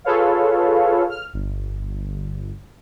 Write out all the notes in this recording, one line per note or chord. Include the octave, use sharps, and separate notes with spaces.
F4 G#4 A4 B4 C#5 F5
F6
G1